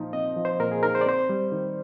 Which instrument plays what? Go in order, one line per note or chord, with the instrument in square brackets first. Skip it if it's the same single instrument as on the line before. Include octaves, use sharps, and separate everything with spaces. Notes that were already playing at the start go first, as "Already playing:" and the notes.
Already playing: [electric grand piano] A#2 F3 D#4
[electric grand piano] C4 [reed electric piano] D#5
[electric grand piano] F3
[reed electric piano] C5
[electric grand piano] A#2 [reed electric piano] A#4
[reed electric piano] G#4
[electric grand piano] D#4 [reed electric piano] A#4
[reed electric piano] C5
D5
[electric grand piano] C4 [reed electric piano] C5
[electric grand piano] G3
D#3